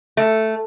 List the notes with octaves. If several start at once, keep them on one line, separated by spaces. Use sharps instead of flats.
A3